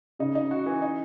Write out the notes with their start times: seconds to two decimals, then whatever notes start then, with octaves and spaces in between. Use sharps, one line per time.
0.19 C#3 D#4
0.35 D#4
0.51 F#4
0.66 E3
0.82 D#4